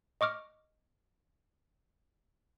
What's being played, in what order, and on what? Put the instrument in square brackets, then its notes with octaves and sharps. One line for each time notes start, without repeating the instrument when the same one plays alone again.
[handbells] D#5 C#6 D6 F6